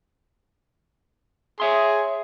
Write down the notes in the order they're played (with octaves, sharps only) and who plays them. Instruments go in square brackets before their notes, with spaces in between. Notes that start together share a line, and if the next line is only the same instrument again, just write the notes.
[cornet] G#4 [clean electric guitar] C#5 E5 C6